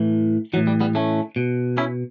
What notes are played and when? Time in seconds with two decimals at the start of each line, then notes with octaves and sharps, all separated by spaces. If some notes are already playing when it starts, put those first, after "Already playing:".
Already playing: A2 E3
0.53 E3 F#3
0.56 A2
0.67 G3
0.81 G3 B3
0.95 A3 C#4
1.36 B2
1.78 C#4 E4